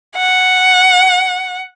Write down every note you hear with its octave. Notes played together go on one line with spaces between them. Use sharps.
F#5